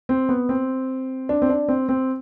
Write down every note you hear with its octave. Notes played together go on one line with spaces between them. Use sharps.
C4
B3
C4
D4
C4
D4
C4
C4